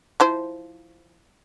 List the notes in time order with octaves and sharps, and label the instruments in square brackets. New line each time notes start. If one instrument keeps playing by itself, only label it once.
[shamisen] F3 E4 C5